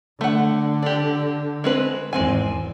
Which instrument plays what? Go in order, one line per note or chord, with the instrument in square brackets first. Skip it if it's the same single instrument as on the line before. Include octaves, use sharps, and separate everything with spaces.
[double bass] D3 [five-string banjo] A3 F#5
[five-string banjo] D4 G4
G#3 C4 B4
[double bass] G#1 E2 [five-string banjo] G#3 C4 G#5